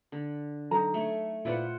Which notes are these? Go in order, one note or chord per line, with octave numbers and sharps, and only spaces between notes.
D3
F#3 D#4 A4 A#5
A3 C#5
A#2 E4 F4 B4 C5 D5 F#5